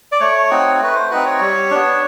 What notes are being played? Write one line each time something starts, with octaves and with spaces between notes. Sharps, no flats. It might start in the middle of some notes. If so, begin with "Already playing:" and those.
D5
A3 C#5
C4 D#4 F#4
A3 B4
C5
C4 D#4 F#4 B4
C#5
G3
B3 D4